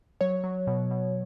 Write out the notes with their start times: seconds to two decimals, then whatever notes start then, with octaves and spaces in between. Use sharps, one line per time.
0.21 F#3 C#5
0.44 F#3
0.67 B2
0.91 B2